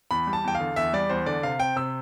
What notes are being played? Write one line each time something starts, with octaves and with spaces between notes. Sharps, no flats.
E2 B5
G3
A5
E2 G5
F5
D3
E2 E5
G3 D5
E2 C5
D3 D5
C3 F5
C4 G5
C3 E6